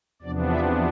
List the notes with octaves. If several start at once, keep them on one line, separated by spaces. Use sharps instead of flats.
E2 C3 F3 B3 D4 D5
E5